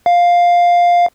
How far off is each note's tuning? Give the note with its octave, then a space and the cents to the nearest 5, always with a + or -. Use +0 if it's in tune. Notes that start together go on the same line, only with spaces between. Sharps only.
F5 +5